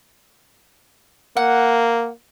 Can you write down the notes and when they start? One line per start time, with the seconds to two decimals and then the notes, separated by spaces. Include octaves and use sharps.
1.37 A#3 F#5